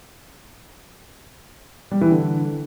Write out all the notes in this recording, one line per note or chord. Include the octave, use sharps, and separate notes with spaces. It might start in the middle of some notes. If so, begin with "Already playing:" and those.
G3
E3
D3